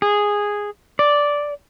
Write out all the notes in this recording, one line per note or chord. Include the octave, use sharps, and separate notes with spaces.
G#4
D5